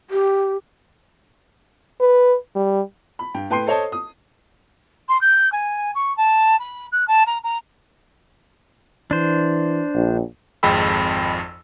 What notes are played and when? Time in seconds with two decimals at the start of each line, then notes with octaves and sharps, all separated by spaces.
0.10 G4
2.00 B4
2.56 G3
3.19 B5
3.34 G2 G5
3.50 A2 B4 G5 C6 C7
3.67 A4 C5 C#5 D#5 A5
3.92 D#6
5.08 C6
5.21 G6
5.52 G#5
5.95 C#6
6.17 A5
6.59 B5
6.92 F#6
7.07 A5
7.26 A#5
7.43 A#5
9.11 E3 D4 C5
9.94 A#1
10.63 G#1 F2 G#3 G5 B5 E6